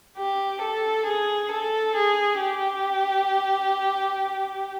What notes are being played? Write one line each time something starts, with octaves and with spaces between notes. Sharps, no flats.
G4
A4
G#4
A4
G#4
G4